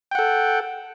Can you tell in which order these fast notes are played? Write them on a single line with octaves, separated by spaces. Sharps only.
G5 F#5 A4